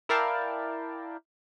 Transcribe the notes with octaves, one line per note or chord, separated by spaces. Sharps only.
E4 A#4 D5 F5 G5 A5